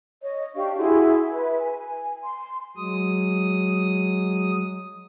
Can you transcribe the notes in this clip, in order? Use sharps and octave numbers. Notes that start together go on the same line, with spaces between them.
C#5 D#5
D4 G4 F5 C#6
E4 F#4 G#4 C6
B4 E5
G#5
C6
F#3 G#3 D#6